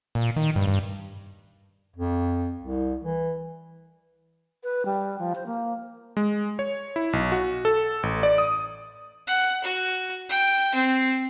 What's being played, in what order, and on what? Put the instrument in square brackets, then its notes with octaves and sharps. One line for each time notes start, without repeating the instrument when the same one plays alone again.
[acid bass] A#2
D#3
G2
G2
[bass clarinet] F2
C2
E3
[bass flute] B4
G3
F3
C5
A#3
[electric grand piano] G#3
C#5
E4
B1
F#4
A4
A1
D5
D#6
[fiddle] F#5
F#4
G5
C4